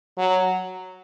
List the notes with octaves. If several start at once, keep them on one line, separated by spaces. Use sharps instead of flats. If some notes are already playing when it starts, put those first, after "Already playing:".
F#3